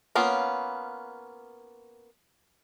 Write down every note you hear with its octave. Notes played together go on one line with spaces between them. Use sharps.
A#3 B3 C#4 F4